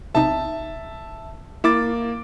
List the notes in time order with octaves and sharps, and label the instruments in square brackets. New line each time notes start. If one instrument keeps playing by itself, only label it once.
[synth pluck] B1 C3 D#4 [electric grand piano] E5 A5
[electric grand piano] A#3 D6 A6 [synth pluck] E4